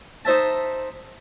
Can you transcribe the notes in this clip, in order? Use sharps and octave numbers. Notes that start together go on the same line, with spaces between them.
D#4 C5 E5 A5